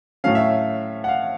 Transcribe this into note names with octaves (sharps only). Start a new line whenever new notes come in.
A2 F#3 A3 C#4 F5
E5
F5
F#5
F5